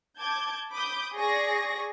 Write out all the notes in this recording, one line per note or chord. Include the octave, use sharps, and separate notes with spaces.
A5 D6 G6 G#6
B5 D6 D#6 G6
G#4 D5 C#6 A#6